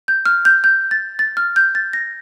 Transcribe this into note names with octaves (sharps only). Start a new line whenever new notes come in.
G6
F6
G6
G6
A6
A6
F6
G6
A6
A#6